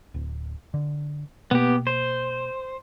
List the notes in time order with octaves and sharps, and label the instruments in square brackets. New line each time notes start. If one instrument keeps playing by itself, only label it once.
[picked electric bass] D1
D3
[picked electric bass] B2 A#3 [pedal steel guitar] B3 G4
[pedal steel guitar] C5